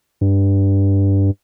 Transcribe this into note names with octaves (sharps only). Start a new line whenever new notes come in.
G2